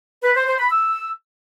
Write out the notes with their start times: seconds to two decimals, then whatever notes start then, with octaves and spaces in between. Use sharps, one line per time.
0.24 B4
0.35 C5
0.47 C5
0.59 B5
0.71 E6